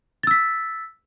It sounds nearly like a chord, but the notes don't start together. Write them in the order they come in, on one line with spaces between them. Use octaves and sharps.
A6 E6 B6